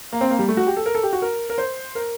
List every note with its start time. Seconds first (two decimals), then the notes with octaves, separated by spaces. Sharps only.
0.12 A#3
0.21 C4
0.31 A#3
0.39 G3
0.49 A3
0.57 F#4
0.67 G4
0.77 A4
0.86 A#4
0.95 A4
1.03 G4
1.13 F#4
1.22 A#4
1.50 A#4
1.58 C5
1.95 A#4